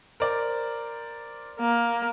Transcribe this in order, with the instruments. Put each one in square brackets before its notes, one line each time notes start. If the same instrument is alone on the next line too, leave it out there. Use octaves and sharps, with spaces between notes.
[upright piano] A#4 C5 D5
[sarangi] A#3